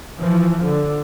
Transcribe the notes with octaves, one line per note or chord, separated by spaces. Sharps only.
E3 F3
D3